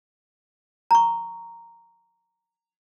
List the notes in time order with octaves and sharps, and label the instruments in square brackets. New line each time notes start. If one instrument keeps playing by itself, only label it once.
[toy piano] A#5 C#6